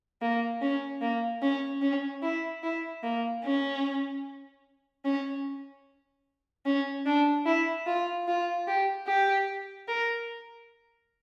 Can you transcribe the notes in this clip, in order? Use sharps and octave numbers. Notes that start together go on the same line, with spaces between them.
A#3
C#4
A#3
C#4
C#4
E4
E4
A#3
C#4
C#4
C#4
D4
E4
F4
F4
G4
G4
A#4